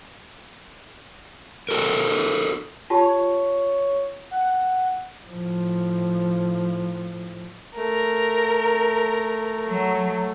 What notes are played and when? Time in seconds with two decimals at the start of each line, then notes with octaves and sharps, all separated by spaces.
1.69 F#4 A4 A#4
2.90 F4 G4 C#5 A5
4.31 F#5
5.27 A2 F3
7.76 A3 A#4
9.66 F#3